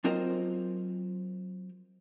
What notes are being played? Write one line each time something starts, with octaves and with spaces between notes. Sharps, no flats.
F#3 C4 F4 A#4 C5 D#5